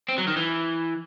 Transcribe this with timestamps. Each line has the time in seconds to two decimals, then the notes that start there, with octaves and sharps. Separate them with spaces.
0.08 C4
0.18 F#3
0.27 D#3
0.37 E3